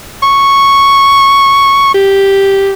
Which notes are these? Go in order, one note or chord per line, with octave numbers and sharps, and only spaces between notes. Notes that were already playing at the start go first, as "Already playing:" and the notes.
C#6
G4